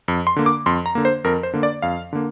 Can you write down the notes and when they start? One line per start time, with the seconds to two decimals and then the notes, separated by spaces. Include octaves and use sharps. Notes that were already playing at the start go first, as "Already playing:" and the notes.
0.08 F2
0.27 C6
0.36 D3 A#3
0.46 D6
0.66 F2 C6
0.86 A#5
0.95 D3 A#3
1.05 C5
1.24 F2 A#4
1.43 C5
1.53 D3 A#3
1.63 D5
1.82 F2 F5
2.13 D3 A#3